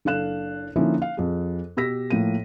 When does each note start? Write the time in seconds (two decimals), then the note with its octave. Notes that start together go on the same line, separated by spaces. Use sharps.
0.05 F#1 D4 A4 F5 F#6 E7
0.76 D3 F3 A#3 C#4 D#4 E4
1.02 F5
1.17 F2 G#4
1.77 B2 G4 E6 A#6 B6
2.10 A2 F3 A#3 D#7